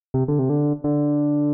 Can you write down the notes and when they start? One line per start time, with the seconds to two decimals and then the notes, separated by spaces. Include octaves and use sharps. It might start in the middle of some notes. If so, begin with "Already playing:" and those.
0.14 C3
0.28 D3
0.39 C3
0.50 D3
0.84 D3